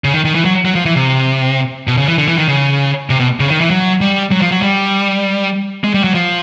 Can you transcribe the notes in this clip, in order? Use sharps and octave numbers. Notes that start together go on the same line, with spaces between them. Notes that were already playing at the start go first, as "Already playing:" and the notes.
C#3
D#3
D#3
E3
F#3
F#3
F3
E3
C3
B2
C#3
E3
D3
E3
D#3
C#3
C3
B2
C#3
D#3
E3
F#3
G3
F#3
F3
F#3
G3
G#3
G3
F#3
F3